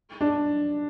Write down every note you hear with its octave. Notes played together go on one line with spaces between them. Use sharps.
D4